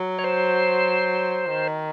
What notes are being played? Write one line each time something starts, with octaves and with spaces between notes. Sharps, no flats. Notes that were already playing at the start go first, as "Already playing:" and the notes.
Already playing: F#3
C#5
C5
D#3